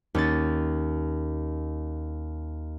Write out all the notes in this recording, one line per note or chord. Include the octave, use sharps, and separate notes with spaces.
D#2 C#4 A6